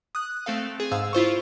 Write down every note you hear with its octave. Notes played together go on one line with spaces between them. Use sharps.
D#6 F#6
A3 C4 A4 F5
G#4
G#2 F5 E6
E4 F4 C5 C#6